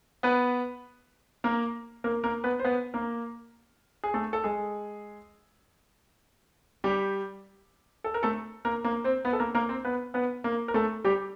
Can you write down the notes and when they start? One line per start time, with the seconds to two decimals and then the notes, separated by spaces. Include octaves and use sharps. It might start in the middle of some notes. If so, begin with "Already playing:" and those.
0.23 B3 B4
1.44 A#3 A#4
2.04 A#3 A#4
2.24 A#3 A#4
2.44 B3 B4
2.59 C5
2.64 B3 B4
2.94 A#3 A#4
4.04 G#4
4.14 A3 A4
4.33 A4
4.44 G#3 G#4
6.84 G3 G4
8.04 A4
8.14 A#4
8.23 A3 A4
8.65 A#3 A#4
8.84 A#3 A#4
9.04 C4 C5
9.25 B3 B4
9.33 A4
9.40 A#3 A#4
9.55 A#3 A#4
9.69 C4 C5
9.85 B3 B4
10.14 B3 B4
10.44 A#3 A#4
10.68 A#4
10.74 A3 A4
11.04 G3 G4